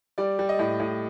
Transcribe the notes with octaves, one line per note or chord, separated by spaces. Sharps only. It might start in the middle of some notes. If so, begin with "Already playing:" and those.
G3 D5
G3
D#5
A2
A2